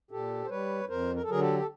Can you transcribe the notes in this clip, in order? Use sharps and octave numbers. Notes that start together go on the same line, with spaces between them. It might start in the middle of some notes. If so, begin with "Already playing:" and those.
A#2 G4 A4
C5
G3 B4 C#5
F2 A#4 C5
A#4
A4
D3 F#3 G#4 A#4
G4 A4
A4